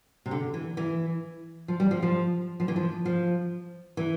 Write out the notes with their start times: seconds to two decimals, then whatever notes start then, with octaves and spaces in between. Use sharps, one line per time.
0.26 C3
0.31 D3
0.54 E3
0.77 E3
1.68 F3
1.80 G3
1.91 F3
2.03 F3
2.60 F3
2.68 E3
2.76 F3
3.05 F3
3.97 E3